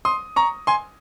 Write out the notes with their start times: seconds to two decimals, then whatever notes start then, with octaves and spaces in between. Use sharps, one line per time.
0.05 C6 D#6
0.36 A#5 C#6
0.67 G#5 C6